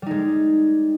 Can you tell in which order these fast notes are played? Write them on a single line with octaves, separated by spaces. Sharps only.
G3 D#4 G#3